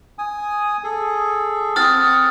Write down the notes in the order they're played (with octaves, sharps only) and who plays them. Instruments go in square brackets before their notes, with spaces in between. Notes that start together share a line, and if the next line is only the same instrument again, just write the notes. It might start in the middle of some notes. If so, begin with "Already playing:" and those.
[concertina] G#5 D#6
G#4 A4
[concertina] C4 F#5 [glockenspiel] D#6 F6 A6